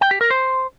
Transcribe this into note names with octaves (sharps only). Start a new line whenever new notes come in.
G5
G4
A#4
C5